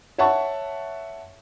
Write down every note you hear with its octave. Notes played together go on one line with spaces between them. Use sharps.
C#5 E5 F#5 A5 C#6